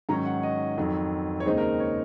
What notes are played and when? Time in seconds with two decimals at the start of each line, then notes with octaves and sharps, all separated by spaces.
0.09 G#2 D#3 F#3 C#4 A#5
0.25 F#5
0.43 D#5
0.78 F2 D#3 F#3
1.40 C#5
1.46 D#2 C#3 G#3 C4 D#4 C5
1.57 A#4
1.80 C#5